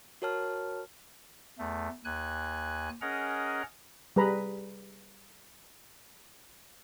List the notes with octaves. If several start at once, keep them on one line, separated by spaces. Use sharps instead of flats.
F#4 A#4 C#5 A5 F6
E2 A3
D#2 G#5 F#6
C#4 G#4 A#4 D#5 F#5 A#5
G3 G#4 B4 A#5 B5